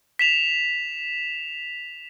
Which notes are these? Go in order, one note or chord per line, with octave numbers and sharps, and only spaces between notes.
B6 E7 F7